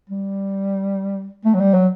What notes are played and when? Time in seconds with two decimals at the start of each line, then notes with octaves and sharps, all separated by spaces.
0.10 G3
1.45 A3
1.55 F#3
1.60 G3
1.74 F#3